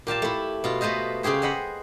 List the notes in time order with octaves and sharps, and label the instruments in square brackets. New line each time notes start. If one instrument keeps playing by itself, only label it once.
[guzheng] A#2 G4 F5 A5
A3 E4
B2 F4
B2 A3 B4 C5 D#5
C#3 C#4 G4 G#4 C5
C5 D#5 F#5 B5